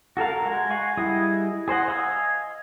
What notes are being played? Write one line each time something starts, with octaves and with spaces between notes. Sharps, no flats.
F#4 A4 A#4 F5
G#3 F#4
F5 F#5 G#5 C#6
G3 E4 G#4 D#5
G#4 C5 D#5 F#5
D#5 F5 G#5 B5 E6